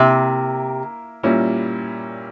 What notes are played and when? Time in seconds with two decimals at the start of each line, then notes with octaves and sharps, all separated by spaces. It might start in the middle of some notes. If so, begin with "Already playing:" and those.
Already playing: C3 A#3 E4 A#4
1.23 A#2 G3 A#3 C#4 E4